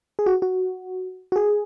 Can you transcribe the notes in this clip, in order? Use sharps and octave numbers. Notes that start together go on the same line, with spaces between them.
G#4
F#4
F#4
F#4
G#4